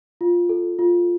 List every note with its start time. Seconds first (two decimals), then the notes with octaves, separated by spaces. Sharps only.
0.21 F4
0.49 A4
0.79 F4